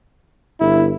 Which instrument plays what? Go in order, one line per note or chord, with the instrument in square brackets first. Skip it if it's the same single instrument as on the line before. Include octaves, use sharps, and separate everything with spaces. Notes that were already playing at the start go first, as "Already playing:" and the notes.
[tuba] G1 [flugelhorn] E4